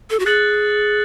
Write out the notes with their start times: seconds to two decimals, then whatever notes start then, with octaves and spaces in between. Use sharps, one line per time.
0.10 A4
0.19 F#4
0.26 G#4 F#6 A6 C#7 F#7